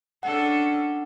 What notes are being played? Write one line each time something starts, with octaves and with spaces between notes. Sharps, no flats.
C#4 D4 A4 F#5